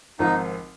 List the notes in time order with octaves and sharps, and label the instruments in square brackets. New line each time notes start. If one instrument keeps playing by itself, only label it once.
[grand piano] G#1 G#2 F3 C4 F4 [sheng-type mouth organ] D#4